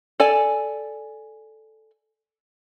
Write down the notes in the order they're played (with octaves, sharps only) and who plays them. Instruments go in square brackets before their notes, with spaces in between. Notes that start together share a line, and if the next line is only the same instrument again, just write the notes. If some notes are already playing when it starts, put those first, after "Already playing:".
[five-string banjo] A4 D5 G#5